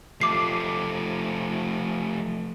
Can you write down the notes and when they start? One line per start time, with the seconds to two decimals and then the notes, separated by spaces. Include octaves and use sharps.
0.21 F3 A3 D6 C7